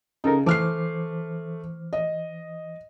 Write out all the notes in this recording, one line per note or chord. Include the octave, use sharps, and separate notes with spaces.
C#3 D#4 A4 A#4
E3 A3 C5 D6 F6 C7
D#5